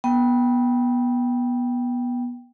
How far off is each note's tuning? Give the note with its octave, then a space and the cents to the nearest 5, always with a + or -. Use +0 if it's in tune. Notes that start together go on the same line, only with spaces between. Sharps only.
B3 -20 G5 +0